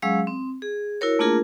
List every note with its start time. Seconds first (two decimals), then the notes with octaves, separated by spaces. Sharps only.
0.02 F#3 G#3 C#4 G#4 F5 E6
0.27 C4
0.62 G#4
1.01 E4 F#4 A#4 C#5
1.19 A3 A#3 D4 F4 G#4 A#4